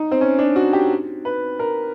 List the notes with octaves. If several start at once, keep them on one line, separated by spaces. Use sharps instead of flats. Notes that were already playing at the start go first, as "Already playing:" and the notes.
Already playing: D#4
C4
C#4
D4
F#4
G4
B4
A#4